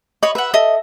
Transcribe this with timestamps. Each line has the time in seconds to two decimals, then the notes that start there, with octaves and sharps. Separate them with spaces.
0.23 C#5 D#5 B5 C#6
0.35 B4 E5 F#5
0.54 A4 D#5 E5